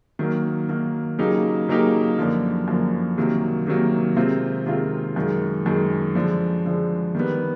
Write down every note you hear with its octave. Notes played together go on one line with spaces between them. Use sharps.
D#3 F#3 A#3
D#3 F#3 A#3
C#3 F#3 A#3 D#4 G4
C#3 F#3 A#3 D#4 G4
F#2 D3 F3 A#3
F#2 D3 F3 A#3
C3 D#3 F#3 A#3
C3 D#3 F#3 A#3
C3 D#3 G#3 C4 F4
C3 D#3 G#3 C4 F4
F#2 D#3 G#3
F#2 D#3 G#3
D3 F3 G#3
D3 F3 G#3
D#3 G3 B3